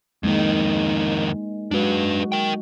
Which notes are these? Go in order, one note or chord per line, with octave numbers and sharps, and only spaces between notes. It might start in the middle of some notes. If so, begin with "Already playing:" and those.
F2 D#3 G#3 A#3 D#4
F#3 G#3 D4 F#4 B4
A#4 G5